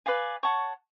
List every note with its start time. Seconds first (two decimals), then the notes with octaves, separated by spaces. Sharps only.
0.06 B4 D5 F5 G#5
0.43 C#5 F#5 A5 C#6